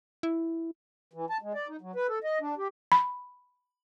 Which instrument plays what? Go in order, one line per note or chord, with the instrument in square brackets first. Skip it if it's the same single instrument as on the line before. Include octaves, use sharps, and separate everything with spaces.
[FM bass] E4
[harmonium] E3
A5
G#3
D5
D#4
F#3
B4
A4
D#5
D4
G4
[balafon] B5